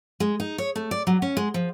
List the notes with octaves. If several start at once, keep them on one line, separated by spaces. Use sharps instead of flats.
G#3
D#4
C#5
A3
D5
F#3
C#4
G#3
F3